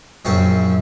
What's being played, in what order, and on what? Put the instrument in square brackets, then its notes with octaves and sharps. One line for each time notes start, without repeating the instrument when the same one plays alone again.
[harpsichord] A#1 F#2 C4 C#4 C#5